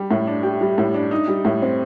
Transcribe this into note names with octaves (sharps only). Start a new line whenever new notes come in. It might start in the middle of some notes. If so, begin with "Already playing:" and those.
Already playing: G3 G4
A2
D4
G4
G3
A2
D4
D#4
G3
A2
C4